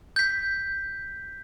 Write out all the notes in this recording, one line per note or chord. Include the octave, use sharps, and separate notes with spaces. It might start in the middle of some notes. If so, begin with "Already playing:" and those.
G6 B6